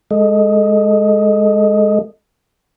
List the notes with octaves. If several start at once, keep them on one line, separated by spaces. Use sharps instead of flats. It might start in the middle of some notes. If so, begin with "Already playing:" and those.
G#3 A4 D#5